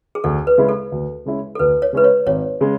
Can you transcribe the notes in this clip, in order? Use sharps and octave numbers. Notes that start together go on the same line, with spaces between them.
G#4
D2 A4
B4
C#3 G#3 C#4 E4
A4
D2
C#3 G#3 C#4 E4
A4
D2 B4
C#5
C#3 G#3 C#4 E4 B4
C#5
G#1 C#5
C#3 G#3